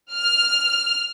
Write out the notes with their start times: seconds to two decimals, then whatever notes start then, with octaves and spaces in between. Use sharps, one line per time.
0.13 F6